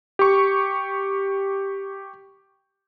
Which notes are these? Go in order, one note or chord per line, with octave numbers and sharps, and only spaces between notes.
G4 C#6